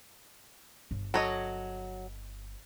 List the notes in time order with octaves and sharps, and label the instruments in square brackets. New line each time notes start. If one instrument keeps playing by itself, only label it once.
[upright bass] G1
[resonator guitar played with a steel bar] F#3 [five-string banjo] A4 C#5 D#5